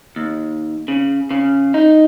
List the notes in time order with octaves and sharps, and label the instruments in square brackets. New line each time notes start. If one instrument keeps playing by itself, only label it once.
[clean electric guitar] D#2
C#3
C#3
D#4